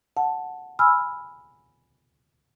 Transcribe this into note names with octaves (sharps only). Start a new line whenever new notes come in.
F#5 A5
G#5 B5 E6 F6